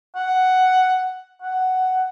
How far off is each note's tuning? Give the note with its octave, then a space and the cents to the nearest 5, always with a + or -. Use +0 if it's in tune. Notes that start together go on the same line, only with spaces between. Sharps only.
F#5 +5
F#5 +10